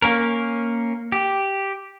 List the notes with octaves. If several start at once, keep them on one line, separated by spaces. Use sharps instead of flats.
A#3 C#4 A#4
G4